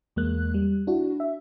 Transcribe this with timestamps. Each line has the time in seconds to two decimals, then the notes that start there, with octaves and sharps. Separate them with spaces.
0.16 E2 G#3 A#3 F#6
0.54 G3
0.87 D4 E4 F#4
1.20 E5